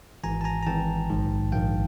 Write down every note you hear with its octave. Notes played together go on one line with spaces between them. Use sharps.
G#1 G#2 E3 G#5 A#5
A5
G#5 A#5
A#5
G#1 G#2 E3 G5 A5
A#1 G#2 D#3
A#1 G#2 D#3 F5 G5